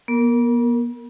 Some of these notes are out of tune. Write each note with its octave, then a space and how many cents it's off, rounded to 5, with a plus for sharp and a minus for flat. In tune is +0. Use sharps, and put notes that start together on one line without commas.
B3 -45 A#4 -10